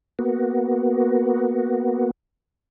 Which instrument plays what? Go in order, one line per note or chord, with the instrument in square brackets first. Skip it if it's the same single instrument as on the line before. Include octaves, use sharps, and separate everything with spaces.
[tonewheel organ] A#3 B3 F#4